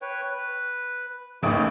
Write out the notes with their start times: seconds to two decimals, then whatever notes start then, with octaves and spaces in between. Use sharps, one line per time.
0.02 B4 C#5 G5
0.30 B4
1.43 A1 D#2 C#3 A3 E4 G4